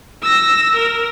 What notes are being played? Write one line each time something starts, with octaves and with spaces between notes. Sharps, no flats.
E6 A#6
A#4